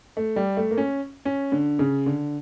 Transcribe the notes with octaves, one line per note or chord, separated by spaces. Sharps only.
A3
G3
A3
A#3
C#4
C#4
D3
C#3
D3